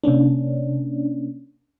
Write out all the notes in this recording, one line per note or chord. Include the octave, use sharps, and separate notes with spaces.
C3 A#3 C#4 D4